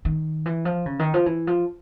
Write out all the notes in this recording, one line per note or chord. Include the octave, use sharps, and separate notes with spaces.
D#3
E3
F3
C#3
D#3
F3
E3
F3